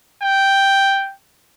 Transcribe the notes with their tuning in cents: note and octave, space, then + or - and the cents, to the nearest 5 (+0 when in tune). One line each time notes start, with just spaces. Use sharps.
G5 +0